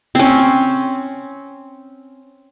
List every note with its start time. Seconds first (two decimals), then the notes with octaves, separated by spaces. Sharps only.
0.15 C4 C#4